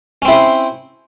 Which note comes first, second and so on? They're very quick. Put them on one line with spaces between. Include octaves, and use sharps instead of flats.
C#4 C4 E4 C5